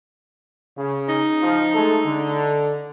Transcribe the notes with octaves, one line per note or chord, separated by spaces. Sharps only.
C#3
D#4
F3
G#3 A3 A4
D3